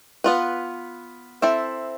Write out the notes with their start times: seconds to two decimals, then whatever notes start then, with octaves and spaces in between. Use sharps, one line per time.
0.24 B3 F4 B4
1.42 C4 E4 A4 C5 E5